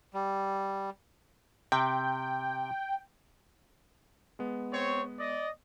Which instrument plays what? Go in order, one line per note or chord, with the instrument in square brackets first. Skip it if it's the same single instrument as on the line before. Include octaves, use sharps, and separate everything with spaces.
[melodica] G3
[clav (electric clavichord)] C3 [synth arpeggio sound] G5
[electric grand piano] G#3 B3
[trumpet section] C4 C#5
D5 D#5